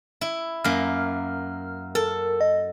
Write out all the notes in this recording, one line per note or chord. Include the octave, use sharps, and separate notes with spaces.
E4
F#2 A#3 F6
A4 A#4
D#5